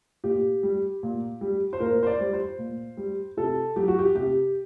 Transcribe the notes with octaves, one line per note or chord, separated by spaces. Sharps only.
A#2 G4
G3
A#2
G3
C5
A#2 A#4
C5
D5
G3
C5
A#2
G3
C3 A4
F#3 G4
F#4
G4
C3 G4